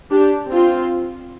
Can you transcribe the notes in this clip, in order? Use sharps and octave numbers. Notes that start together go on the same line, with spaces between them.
D4 G4
C4 F4